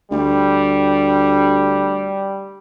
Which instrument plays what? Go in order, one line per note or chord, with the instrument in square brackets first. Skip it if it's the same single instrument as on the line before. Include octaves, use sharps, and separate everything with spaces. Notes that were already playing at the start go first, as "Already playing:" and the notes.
[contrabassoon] D2 [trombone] G3